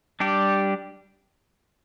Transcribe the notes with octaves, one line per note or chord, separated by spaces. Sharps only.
G3 D4 G4